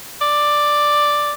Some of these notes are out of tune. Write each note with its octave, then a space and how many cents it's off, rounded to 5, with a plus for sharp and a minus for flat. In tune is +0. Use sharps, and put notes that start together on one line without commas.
D5 +5